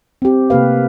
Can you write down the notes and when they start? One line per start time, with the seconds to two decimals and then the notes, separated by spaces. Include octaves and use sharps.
0.22 C4 G4
0.50 C3 A3 A#3 G4 B4 F5